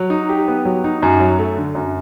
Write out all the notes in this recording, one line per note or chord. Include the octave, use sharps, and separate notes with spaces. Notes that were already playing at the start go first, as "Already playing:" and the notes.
Already playing: F#3
D#4
G4
B3
F#3
D#4
F#2
F#3
A3
D3
F#2